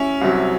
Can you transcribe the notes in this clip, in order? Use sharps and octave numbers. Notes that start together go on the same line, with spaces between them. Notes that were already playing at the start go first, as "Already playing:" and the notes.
Already playing: C#4 E4
C2 C3 F#3